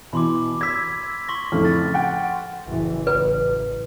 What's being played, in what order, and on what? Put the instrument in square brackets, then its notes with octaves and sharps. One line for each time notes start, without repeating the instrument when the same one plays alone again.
[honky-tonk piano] B2 E3 [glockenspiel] B5 C6 D6
[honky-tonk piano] E6 G#6 [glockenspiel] A#6 B6
[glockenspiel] C6 C#6 A#6
[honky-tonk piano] F2 A2 C#3 [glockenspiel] F6
[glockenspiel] A6
[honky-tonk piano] F#5 G5
[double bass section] F#1 A2 E3
[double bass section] A1 [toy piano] B4